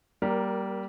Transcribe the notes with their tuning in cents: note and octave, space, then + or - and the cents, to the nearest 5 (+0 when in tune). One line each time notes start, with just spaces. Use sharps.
G3 -15 A#3 +20 A#4 +0